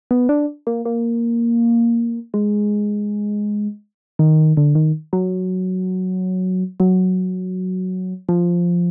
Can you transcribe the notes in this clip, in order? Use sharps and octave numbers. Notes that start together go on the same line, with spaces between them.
B3
D4
A#3
A#3
G#3
D#3
D3
D#3
F#3
F#3
F3